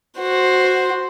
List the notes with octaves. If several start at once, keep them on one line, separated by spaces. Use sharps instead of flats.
F#4 C5